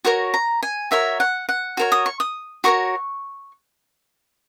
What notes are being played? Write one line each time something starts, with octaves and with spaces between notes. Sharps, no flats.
F#4 A#4 C#5 C#6
A#5
G#5
F#4 A#4 C#5 E5
F#5
F#5
F#4 A#4 C#5
D#6
C#6
D#6
F#4 A#4 C#5 C#6